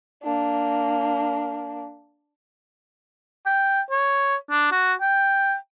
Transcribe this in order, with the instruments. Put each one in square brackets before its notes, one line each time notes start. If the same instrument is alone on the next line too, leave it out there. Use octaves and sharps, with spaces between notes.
[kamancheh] A#3 D4
[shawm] G5
C#5
D4
F#4
G5